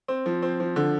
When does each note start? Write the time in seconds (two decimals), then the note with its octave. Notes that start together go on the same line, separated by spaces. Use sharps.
0.08 C4
0.26 F3
0.42 C4
0.60 F3
0.76 D3